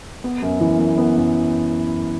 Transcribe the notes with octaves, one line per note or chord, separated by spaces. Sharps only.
B3
F#2
E3
F#2
B3
F#2